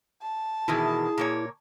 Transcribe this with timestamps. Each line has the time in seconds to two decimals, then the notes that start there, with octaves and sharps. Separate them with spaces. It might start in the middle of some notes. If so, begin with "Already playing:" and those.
0.22 A5
0.68 B2 D#3 E3 E4 G#4
1.18 A#2 A#3 C#5